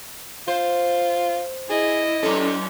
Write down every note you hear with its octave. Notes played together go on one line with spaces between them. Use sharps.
F4 C5
E4 G#4 D#5
F#2 C#4 A4